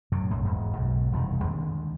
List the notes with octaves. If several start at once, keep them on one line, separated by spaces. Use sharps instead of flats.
F#2 A2 C3
B1 F#2 F#3
E1 G#2
B1 F#2
E1 C2 D#3
D#2 D3 G#3